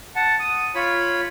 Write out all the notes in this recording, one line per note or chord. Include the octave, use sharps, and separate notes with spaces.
F#5 A5
D#6
F4 C#5 B5